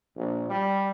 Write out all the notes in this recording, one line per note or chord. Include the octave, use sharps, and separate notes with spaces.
A#1
G3